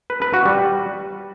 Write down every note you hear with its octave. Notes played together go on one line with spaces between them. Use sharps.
B4
B4
F#4
G3